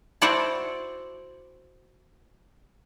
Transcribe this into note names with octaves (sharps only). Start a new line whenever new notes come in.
E4 F#4 C5 D5 F#5 A5